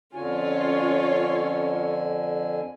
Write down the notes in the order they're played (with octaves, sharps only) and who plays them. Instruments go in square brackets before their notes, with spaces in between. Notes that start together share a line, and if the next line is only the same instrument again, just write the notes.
[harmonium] F2 D3 G#5 [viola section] C#4 F4 C#5